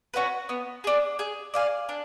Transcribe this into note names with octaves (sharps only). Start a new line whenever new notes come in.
C#4 F#4 B4
B3
D4 G#4
G#4
D5 F5 G#5
D4